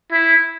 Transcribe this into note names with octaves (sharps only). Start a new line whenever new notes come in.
E4